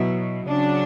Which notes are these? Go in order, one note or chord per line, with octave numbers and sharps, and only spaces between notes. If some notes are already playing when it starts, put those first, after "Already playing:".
Already playing: B2 F#3 E4
C#3 F#3 D4